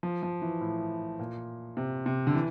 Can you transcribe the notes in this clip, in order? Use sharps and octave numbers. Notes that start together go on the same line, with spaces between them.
F3
F3
E3
A2
A#2
C3
C3
D3
E3